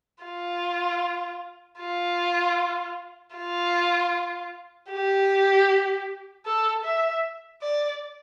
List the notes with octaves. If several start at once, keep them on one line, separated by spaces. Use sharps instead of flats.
F4
F4
F4
G4
A4
E5
D5